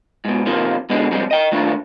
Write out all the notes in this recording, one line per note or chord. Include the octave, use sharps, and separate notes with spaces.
G#2 B2
C3 D#3 F3 A#3
G#2 B2 D3 G#3
F2 C3 G3 G#3
D#5 G5
D#3 A3 A#3 D4 F4